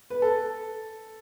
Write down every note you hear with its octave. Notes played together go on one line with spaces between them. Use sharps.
B4
A4